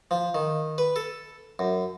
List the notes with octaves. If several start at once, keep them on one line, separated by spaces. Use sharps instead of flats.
F3
D#3
B4
A4
F#2